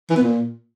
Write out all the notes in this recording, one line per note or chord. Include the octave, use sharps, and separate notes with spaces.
E3
B3
A#2